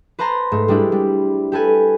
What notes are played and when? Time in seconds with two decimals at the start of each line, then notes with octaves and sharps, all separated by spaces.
0.19 B4 C5 A5 A#5 C6
0.52 G#2 A3
0.68 G3 G#3 D4 E4 G4
0.92 G3
1.52 G4 A4 B4 G#5